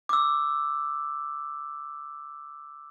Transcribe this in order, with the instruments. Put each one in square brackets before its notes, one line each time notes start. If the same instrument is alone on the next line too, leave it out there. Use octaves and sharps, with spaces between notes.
[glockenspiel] D6 E6